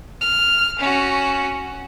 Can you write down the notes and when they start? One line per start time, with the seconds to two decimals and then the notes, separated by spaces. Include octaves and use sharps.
0.21 F6
0.79 C#4 F#4